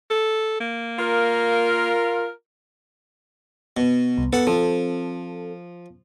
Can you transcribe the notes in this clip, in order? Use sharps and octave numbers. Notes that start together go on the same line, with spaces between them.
A4
A#3
F4 A#4
B2
C2
B3 A4 F#5
F3 C4 A4